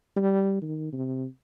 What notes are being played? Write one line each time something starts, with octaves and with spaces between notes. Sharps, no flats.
G3
D#3
C3